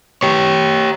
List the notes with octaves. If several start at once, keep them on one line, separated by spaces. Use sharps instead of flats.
G4 C#5